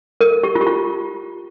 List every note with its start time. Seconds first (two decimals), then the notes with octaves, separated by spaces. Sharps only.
0.21 A#4
0.43 G4
0.55 F4
0.61 G4
0.67 F4